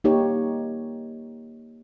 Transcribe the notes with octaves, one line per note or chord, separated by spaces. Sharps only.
A#3 D#4 G4 C#5